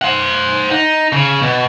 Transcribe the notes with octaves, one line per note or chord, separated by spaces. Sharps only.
C5 F#5
D#4
C#3
B2